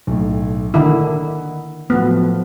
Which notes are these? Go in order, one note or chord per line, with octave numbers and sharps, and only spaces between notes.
B1 A2
D3 D#3 E4 D#5 F#5
A2 F3 F#3 B3